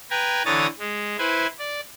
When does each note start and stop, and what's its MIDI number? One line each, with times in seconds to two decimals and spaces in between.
0.10 0.43 71
0.10 0.43 79
0.10 0.43 80
0.10 0.43 82
0.45 0.67 50
0.45 0.67 52
0.45 0.67 73
0.45 0.67 82
0.45 0.67 87
0.45 0.67 93
0.79 1.17 56
1.18 1.47 64
1.18 1.47 71
1.18 1.47 72
1.18 1.47 80
1.59 1.80 74